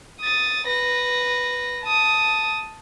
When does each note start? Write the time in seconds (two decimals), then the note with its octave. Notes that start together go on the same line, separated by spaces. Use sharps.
0.21 D#6 A6
0.67 B4 A#6
1.83 A5 D#6